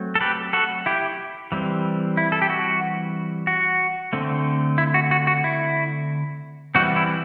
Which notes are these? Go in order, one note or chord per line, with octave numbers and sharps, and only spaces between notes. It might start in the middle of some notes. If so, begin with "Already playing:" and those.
Already playing: F#3 A3 C4
A4
G4 B4
F#4 A4
E4 G4
E3 G3 C4
E4
A4
G4
F#4
F#4
D3 A3 C4
E4
F#4
F#4
F#4
E4
E3 G3 C4 F#4
E4